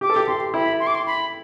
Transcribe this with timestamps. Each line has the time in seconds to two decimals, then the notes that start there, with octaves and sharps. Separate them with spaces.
0.01 G4 D6
0.10 A4
0.16 G4
0.27 G4 C6
0.54 E4 B5
0.80 C6
0.87 D6
0.95 C6
1.06 B5